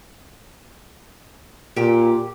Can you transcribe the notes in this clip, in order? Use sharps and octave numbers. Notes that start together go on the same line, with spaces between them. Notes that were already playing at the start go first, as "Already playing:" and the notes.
A#2 G4